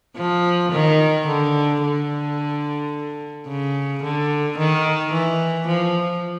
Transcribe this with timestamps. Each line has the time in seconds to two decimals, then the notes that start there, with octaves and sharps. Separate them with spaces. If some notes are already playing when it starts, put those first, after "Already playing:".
0.17 F3
0.73 D#3
1.27 D3
1.83 D3
3.48 C#3
4.03 D3
4.58 D#3
5.13 E3
5.68 F3